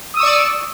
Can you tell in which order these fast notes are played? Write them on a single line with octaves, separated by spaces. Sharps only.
D#6 E6 C#6 D5